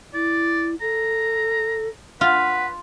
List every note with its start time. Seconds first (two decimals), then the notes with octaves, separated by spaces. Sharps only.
0.14 E4 D5
0.81 A4 A#5
2.21 F4 B4 F#5